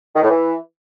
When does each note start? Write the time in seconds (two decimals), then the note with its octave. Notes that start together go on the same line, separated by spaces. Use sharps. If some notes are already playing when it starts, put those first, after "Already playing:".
0.16 D#3
0.22 A2
0.29 E3